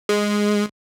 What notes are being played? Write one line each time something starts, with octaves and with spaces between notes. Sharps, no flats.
G#3